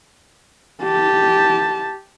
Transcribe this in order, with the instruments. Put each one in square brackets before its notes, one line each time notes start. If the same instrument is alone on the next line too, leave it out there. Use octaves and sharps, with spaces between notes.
[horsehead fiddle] G4 A5